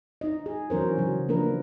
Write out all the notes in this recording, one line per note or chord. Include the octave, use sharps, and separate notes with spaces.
D#4 D#5
G#4
E3 F#3 C#4 A#4 C5
C#3 F#3 G#4
F3 A#3 D4 A#4 B4